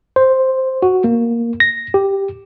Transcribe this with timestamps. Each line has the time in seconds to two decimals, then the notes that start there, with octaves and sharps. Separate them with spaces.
0.16 C5
0.83 F#4
1.04 A#3
1.60 A#6
1.94 G4